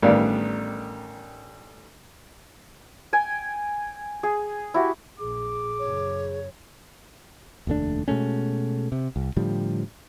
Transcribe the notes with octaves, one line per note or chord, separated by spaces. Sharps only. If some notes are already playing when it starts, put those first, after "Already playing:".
A1 D#3 G3 B3 D4 F5
G5 G#5
G#4
E4 F#4 G4
A#1 G#4 D6
F#2 C#3 C#5
F1 D#2 A3 D4
B2 G#3 A3 C#4
C3
C2
A2 D3 F3 G3